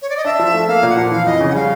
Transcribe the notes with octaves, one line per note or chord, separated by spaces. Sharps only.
C#5
D5
D#5
D4 E5
F3
A3
A#3 F5
A#2
F#5
F3
E3 F5
F2 D#5
C#3
F#5
G3 F5